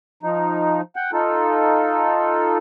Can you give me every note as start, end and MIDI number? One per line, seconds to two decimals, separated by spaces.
0.23 0.81 53
0.23 0.81 63
0.96 1.11 78
0.96 1.11 79
1.13 2.58 63
1.13 2.58 65
1.13 2.58 69